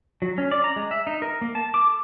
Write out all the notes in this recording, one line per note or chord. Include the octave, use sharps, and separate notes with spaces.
F#3
C#4
D5
A#5
G#3
E5
D#4
A#4
A#3
A5
D6
A4